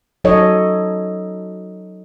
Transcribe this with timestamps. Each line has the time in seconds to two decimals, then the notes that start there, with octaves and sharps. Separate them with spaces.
0.24 F#3 D#4 A4 C#5 D#5